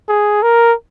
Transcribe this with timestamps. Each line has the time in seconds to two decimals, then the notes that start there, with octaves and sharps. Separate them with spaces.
0.09 G#4
0.43 A#4